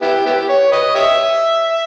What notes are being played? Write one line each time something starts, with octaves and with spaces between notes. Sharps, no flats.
B3 E4 G4
B3 E4 G4
C#5
B4 D#5
G4 C#5 E5